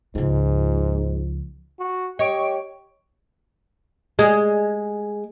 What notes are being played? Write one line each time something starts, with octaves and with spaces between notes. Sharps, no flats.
C#2 G#2 F3
F#4
G4 C#5 D#5 C#6 D7
G#3